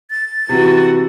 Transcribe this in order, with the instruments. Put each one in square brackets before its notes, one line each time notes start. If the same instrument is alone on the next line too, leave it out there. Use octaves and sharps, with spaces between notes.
[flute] A6
[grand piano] C3 [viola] E3 F#4